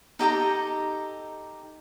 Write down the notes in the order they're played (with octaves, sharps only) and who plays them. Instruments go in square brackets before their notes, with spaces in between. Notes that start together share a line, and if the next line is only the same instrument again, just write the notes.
[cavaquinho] D#4 G4 A4 A#5